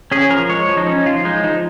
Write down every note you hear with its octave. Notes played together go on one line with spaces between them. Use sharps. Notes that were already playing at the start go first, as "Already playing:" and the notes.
C#4 G#4
F3 A#4
G#3 C#5
F3
D#4
C#4
F3 F4
G#3 D#4
F3 D#4